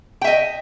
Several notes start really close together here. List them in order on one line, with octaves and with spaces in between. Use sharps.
G5 E5 D#5